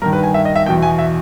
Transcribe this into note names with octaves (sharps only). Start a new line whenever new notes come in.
G2 D#3 A#4
B4
G#5
E5
D#5
E5
E2 B2 G5
G#5
E5